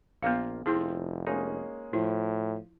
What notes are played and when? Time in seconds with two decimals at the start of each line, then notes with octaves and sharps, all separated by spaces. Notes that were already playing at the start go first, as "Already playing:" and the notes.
0.23 A#1 A#3 B3 F4 F5
0.66 F1 F3 C4 E4 G#4
1.27 G#3 A#3 C#4 D#4
1.93 A2 F3 E4